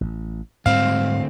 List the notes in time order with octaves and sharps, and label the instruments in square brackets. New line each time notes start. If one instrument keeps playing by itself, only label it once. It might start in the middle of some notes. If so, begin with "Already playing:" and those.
[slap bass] A1
[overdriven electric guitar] D2 C4 [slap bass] G#2 G3 G#3 [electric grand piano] F5